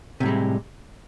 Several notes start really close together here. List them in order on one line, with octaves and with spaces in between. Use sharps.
C3 A2 G3 G#3